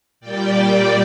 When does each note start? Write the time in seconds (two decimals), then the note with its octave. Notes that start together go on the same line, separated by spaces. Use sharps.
0.20 A#2 G3 D5 G5